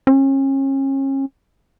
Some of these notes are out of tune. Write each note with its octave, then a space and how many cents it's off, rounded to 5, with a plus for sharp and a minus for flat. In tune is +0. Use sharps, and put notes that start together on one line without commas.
C#4 -35